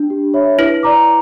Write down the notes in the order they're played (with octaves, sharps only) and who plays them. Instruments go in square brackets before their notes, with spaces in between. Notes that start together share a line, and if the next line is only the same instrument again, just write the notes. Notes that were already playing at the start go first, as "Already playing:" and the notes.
Already playing: [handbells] D4
[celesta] G4
C#5 E5 B5
[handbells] E4 [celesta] B4
[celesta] D5 A#5 D6